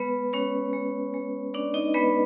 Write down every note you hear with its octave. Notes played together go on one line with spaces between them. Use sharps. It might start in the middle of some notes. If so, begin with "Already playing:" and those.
Already playing: G#3 B3 B4
G#3 C#4 C#5
G#3
G#3
C#4 D4 D5
D#4 D#5
G#3 B3 B4